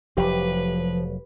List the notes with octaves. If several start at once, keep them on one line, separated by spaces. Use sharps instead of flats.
F1 F3 F#3 G4 B4